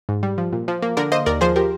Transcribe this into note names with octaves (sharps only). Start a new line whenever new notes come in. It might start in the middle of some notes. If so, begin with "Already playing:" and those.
G#2
G3
F3
A#2
F3
A#3
D3 A#4 D5
A#3 C5 D#5
D#2 A#4 D5
F3 G#4 C5
F3 G4 A#4